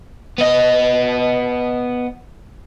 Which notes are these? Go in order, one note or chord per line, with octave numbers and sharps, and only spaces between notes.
B3 D#5